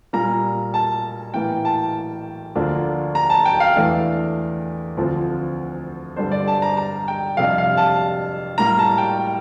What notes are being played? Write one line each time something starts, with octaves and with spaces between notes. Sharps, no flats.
A#2 G3 A#3 A#5
A5
A2 E3 A#3 G5
A5
D2 D3 F3 A#3 D4
A#5
A5
G5
F5
E2 E3 A3 D4
D2 D3 F3 C4
G2 D3 G3 D4 C5
D5
A5
A#5
A#5
G5
F2 C3 G3 D4 F5
F5
A5
A2 G3 A#3 A#5
A5
G5